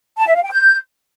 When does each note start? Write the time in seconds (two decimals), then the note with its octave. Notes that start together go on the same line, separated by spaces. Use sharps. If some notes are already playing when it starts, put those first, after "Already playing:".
0.19 A5
0.27 E5
0.35 F5
0.43 G5
0.51 G6